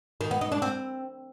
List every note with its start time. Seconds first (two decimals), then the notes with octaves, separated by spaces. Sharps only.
0.21 D#3
0.31 B3
0.41 D#4
0.52 D4
0.62 C4